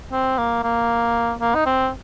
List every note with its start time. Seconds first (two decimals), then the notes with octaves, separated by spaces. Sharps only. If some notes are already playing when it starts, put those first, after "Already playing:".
0.12 C4
0.38 A#3
0.63 A#3
1.41 A#3
1.55 D#4
1.66 C4